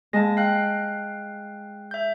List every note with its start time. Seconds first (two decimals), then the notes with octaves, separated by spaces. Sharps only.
0.13 G#3 A#3 A5 A#6
0.37 F5 G5 F#6
1.91 E5 G6